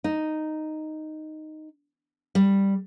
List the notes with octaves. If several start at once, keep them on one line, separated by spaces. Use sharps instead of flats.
D#4
G3